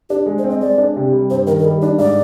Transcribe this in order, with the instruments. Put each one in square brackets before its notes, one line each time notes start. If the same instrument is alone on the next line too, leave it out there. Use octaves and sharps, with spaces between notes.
[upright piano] D4 [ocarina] G4
[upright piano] G#3
[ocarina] C5
[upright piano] C4
[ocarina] D#5
[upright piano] G#3 [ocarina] D5
[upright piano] D4
C3
G3
[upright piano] G2 [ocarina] C5
[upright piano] D#3 [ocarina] A#4
[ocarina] A#4
[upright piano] G3 [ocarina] G#4
[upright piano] D4 [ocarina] D#4
[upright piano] G#2 [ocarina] D5